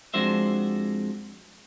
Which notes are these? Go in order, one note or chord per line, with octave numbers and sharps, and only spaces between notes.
F2 G#3 D4 F#4 C5 E5